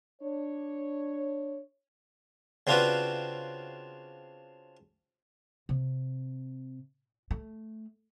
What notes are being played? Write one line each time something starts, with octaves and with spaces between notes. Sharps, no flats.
D4 C#5
C#3 C4 D4 F4 F#4 B4
C3
A3